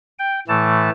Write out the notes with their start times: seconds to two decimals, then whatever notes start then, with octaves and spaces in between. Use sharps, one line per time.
0.19 G5
0.48 A2 E3 A3 A5